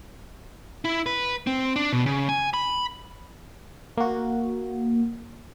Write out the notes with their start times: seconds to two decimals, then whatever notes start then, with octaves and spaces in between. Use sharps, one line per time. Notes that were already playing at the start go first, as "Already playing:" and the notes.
0.85 E4
1.06 B4
1.47 C4
1.76 D4
1.93 B2
2.06 C#3
2.29 G#5
2.54 B5
3.97 A#3 F#4